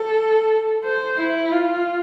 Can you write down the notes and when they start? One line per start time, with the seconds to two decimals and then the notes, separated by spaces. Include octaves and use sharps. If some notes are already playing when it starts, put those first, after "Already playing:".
Already playing: A4
0.85 C5
1.18 E4
1.51 F4